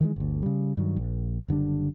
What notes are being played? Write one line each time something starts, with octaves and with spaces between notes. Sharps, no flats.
D#3 E3 G3 G#3
G1 D2
C#3 G3
G2 D#3 F#3
A#1
F#1 D3 G3 D4